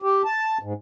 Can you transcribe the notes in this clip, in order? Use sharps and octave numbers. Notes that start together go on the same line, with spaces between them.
G4
A5
G#2